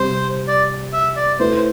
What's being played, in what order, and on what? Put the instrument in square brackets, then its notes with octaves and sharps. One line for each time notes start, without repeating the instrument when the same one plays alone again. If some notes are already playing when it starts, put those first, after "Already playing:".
Already playing: [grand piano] C3 G3 C4 [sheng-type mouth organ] C5
[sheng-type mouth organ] D5
E5
D5
[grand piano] A3 E4 B4 [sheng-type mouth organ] C5
[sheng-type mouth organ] C5